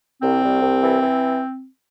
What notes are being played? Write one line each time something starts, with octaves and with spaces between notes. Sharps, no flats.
C2 C4
C2
C2
E3
E3